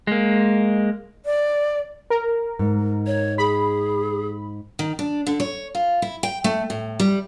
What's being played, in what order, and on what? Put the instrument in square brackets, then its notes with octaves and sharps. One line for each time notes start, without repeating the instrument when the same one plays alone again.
[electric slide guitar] G#3 A#3
[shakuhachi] D5
[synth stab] A#4
[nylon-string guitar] G#2
[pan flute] C#5
[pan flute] G#4 [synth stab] B5
[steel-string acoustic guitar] D#3
D4
D3
C#5
F4
E4
G5
A3
A2
G3